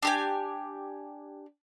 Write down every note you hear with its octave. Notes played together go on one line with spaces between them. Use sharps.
D4 G4 G#5